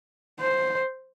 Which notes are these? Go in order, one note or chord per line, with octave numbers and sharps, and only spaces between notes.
C5